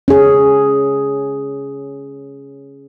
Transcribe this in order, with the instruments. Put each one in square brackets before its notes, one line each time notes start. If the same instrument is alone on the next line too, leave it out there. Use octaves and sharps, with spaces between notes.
[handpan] C#4 G#4